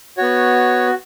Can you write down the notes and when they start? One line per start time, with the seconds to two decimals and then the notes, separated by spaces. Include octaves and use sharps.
0.17 B3 F#4 C#5